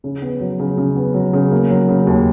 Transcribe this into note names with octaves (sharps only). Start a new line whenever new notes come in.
C#3
B3
F#3
C#3
C#3
B3
F#3
C#3
A#3
F#3
C#3
D#2